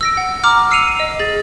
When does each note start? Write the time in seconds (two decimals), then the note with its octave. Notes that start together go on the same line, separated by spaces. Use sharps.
0.01 E6 A#6 D7
0.17 F#5
0.44 A#5 D6 F6
0.71 E6 C7 C#7 D#7 F7
1.00 D#5
1.19 G#4 A6